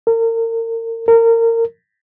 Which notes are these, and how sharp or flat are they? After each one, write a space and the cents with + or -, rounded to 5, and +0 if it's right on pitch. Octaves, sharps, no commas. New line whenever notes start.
A#4 -35
A#4 -25